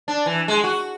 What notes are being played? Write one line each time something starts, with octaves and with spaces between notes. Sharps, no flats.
D4
E3
G#3
F#4